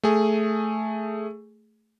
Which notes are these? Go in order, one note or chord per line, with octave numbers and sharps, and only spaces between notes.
A3 G#4